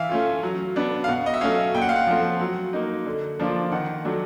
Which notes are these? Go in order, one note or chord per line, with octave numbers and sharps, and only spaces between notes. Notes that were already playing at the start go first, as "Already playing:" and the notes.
Already playing: E3 E5 F5
A3 C#4 F4
F#3
B3 D4
F5
B2 F#5
D#5
E5
F#3 A3 C#4 F5
A#2 G5
F#5
F5
F#5
F3 A3 C4
F#3
A#3 D#4
D3
F3 A#3 D4 F4
D#3 F#5
F#3 A3 D4